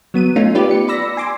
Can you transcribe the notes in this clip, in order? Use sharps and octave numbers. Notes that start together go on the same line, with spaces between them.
F#3 B3 D#7
A3 C#4 D#4 F4
B3 F4 G4 B4 D5
C#7
D5 B5 E6 A#6
G#5 C6 D6